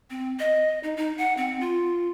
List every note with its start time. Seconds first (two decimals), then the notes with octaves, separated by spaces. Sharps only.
0.10 C4
0.39 D#5
0.84 D#4
0.97 D#4
1.18 F#5
1.37 C4
1.60 F4